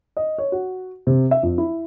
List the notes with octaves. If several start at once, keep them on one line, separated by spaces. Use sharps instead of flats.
D#5
C#5
F#4
C3
E5
F2
E4